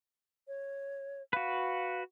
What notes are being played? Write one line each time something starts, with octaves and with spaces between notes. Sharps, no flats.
C#5
F#4 B4 F5